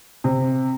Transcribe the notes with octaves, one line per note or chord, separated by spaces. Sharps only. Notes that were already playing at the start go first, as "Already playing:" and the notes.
C3